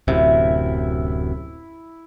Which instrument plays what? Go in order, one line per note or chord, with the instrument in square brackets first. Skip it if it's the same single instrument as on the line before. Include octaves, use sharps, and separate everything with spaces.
[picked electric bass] D1 F#2 C3 [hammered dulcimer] E4